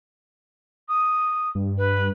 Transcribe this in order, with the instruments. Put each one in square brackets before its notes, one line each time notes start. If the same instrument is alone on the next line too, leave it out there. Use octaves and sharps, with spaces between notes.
[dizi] D#6
[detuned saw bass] G2
[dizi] B4